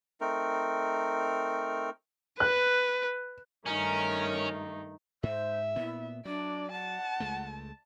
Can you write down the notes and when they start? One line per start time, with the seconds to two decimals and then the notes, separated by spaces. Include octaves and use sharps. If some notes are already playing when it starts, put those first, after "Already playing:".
0.21 A3 C4 D#4 A#4
2.40 B4 F#6
3.66 G2 D#3 A3 C#4 D#4 A#4
5.23 G#2 C5 E5
5.76 A#2 B3 E4
6.25 F#3 D4 D5
6.72 F#5 A5
7.20 C#2 G#3 A3